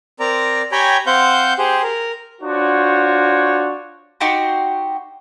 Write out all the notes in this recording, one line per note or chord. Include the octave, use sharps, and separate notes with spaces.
C4 A#4 D5 A#5
G4 C#5 G5 G#5 A#5 B5
C4 C5 F5 F#5 G6
G4 G#4 C5
A#4
D4 F4 F#4 C5 C#5
D#4 F#4 G4 C5